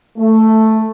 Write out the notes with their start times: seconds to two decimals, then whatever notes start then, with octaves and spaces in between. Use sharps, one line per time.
0.17 A3